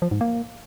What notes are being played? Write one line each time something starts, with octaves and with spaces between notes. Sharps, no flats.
F3
G#2
A#3